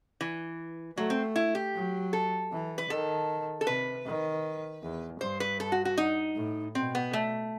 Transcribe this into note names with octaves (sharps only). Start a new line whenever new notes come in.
E3
F#3 A3
C4
E4
G4
F#3
A4
E3
B4
D#3 A4
A4
C3 B4
D#3
E2
G2 C5
B4
A4
F#4
F#4
D#4
A2
B2 C4
B3
A3